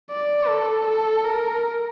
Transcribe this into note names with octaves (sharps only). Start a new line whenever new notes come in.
D5
A4
A4
A#4